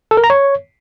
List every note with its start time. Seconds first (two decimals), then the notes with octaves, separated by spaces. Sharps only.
0.11 A4
0.17 A#4
0.24 A#5
0.30 C#5